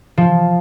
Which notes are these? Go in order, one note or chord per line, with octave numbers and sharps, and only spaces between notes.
F3